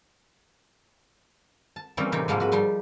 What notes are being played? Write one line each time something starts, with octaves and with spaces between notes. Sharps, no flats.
A5
E3 G3 A#3 C4 C#4 D#4
A2 C3 E3 D#4 G4
G#2 E3 F3 G#3 A#3 E4
F#4 B4
F3 G3 D#4 C6